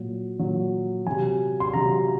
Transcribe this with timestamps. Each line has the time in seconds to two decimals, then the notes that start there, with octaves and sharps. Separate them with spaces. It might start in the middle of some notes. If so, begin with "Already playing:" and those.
Already playing: A#2 F#3
0.39 A#2 F#3
1.06 C3 F#3 G#5
1.60 C6
1.73 C3 F#3 A#5